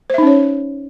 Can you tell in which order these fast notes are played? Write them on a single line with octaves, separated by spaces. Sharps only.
C5 E5 D#4 C#4 C#5